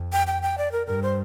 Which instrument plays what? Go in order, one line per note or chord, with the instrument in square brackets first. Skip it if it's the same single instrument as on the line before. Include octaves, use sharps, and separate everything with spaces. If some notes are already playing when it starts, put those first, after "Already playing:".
Already playing: [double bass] F2
[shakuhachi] G5
G5
G5
D5
A#4
[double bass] G2 [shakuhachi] A#4
[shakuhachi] C5